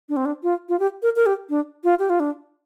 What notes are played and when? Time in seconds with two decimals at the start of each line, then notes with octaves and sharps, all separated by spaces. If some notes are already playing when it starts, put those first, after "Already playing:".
0.09 D4
0.16 C4
0.25 D4
0.43 F4
0.69 F4
0.80 G4
1.03 A#4
1.16 A#4
1.26 G4
1.50 D4
1.84 F4
1.99 G4
2.10 F4
2.20 D4